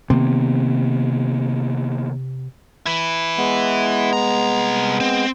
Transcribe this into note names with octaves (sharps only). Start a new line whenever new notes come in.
C3 D#3 A#3 B3
E4 B4
G#3 B3
C2 A#5
C4